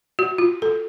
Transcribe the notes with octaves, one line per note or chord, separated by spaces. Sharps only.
F#4
F4
A4